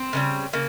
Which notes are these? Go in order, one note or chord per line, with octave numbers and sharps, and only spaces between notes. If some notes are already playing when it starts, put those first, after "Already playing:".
Already playing: C4
C#3 E3 G3
C#3 A#3